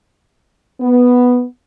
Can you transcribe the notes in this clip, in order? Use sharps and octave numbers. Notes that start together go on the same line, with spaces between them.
B3